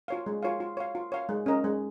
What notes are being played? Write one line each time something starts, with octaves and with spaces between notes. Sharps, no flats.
F4 C#5 F5
G#3
F4 C#5 F5
F4
C#5 F5
F4
C#5 F5
G#3
C#4 A#4 D#5
G#3